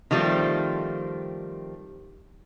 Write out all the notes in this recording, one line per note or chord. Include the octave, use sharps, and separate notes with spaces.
D#3 F3 G3 A3 C4